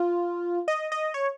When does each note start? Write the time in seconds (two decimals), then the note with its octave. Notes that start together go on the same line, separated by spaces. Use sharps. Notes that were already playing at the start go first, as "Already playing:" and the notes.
Already playing: F4
0.68 D#5
0.92 D#5
1.14 C#5